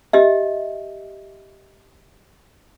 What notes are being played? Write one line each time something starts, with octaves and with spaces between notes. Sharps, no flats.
G4 D#5 E5